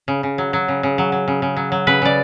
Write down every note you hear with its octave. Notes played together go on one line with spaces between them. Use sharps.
C#3
C#3
F#3
F#3
C#3
C#3
F#3
F#3
C#3
C#3
F#3
F#3
C#3 B4
C#3 D5